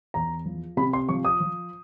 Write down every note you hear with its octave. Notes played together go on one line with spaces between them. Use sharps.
E2 A#5
F3
C3 B5
C6
F3 C#6
D#6
F3